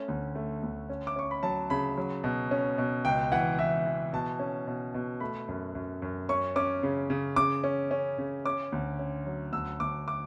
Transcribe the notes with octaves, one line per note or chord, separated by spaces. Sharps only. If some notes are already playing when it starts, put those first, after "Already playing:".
Already playing: A3 C#4
D2
A3
D2
C#4
D6
C#4 C#6
B5
F#3 A5
C#3 B5
F#3
B2
C#4
B2
C#2 G5
E3 F#5
E3 E5
E3
B2 A5
C#4
B2
B2
A3 B5
F#2
F#2
F#2
C#4 C#6
C#4 D6
C#3
C#3
C#3 D6
C#4
C#4
C#3
C#4 D6
D2
C#4
F#3
D2 E6
D2 D6
D6